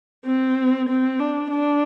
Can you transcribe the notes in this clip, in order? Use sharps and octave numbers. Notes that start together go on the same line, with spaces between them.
C4
C4
D4
D4